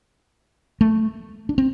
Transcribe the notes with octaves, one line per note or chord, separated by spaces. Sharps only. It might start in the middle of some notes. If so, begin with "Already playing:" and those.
A3
D4
C4